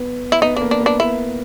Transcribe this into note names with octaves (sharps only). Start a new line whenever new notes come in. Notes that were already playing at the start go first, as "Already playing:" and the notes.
Already playing: B3
E4
B3 D#4
A#3 D4
D4
B3
D4
B3 E4